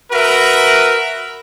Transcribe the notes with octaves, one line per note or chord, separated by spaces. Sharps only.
F#4 A#4 B4 E5